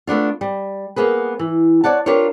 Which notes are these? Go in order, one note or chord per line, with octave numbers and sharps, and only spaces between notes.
A3 B3 D4 F4
G3
A#3 B3 G#4 B4
E3
C#5 D5 F#5 A5
D4 F4 G4 A#4 B4 C#5